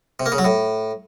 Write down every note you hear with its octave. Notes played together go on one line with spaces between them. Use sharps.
C3
A#3
C#3
F#3
A2